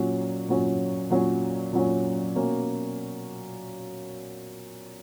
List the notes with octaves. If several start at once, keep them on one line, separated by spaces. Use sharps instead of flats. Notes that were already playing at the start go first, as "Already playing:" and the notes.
Already playing: A#2 F#3 C#4
A#2 F#3 C#4
A#2 F#3 C#4
A#2 F#3 C#4
B2 A#3 C#4